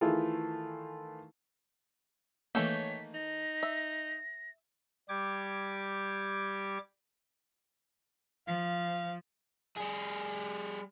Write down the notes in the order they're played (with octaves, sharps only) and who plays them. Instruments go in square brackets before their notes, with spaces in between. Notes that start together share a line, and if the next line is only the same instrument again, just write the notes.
[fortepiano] D#3 E3 A3 E4 F4 G#4
[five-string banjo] D#3 A4 G5 [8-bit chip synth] E3 A3 A#3 [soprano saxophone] C#5 [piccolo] B6
[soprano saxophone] D#4 [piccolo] A#6
[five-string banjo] E5
[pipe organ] G3 G4 D6 G#6
[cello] F3 [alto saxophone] F5
[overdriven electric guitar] G3 G#4